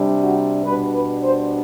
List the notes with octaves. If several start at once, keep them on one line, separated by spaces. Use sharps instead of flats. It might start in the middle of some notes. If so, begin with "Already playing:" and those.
Already playing: C3 G3 D4
F#4
B2 G3 D4 B4
B4
C5